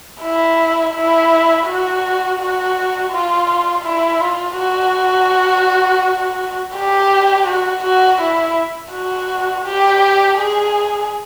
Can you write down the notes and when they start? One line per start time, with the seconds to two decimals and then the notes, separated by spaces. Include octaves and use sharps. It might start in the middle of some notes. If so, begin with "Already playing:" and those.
0.22 E4
0.95 E4
1.67 F#4
2.39 F#4
3.12 F4
3.85 E4
4.21 F4
4.58 F#4
6.76 G4
7.47 F#4
7.84 F#4
8.21 E4
8.93 F#4
9.66 G4
10.39 G#4